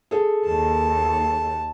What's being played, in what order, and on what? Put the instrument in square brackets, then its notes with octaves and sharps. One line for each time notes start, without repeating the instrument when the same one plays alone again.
[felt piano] G#4 A4
[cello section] D#2 [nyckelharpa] A5